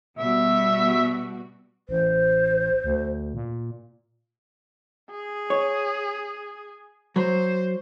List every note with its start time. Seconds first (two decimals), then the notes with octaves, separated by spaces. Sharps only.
0.18 B2 G3 F#4 E5
1.89 A1 C5
2.84 D2
3.34 A#2
5.11 G#4
5.50 C#5
7.16 F#3 C5